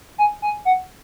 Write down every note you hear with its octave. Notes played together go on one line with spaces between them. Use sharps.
G#5
G#5
F#5